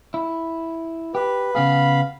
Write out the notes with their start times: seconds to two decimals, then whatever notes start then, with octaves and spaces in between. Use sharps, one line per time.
0.14 E4
1.15 G4 B4
1.55 C#3 B3 G#4 F5 B5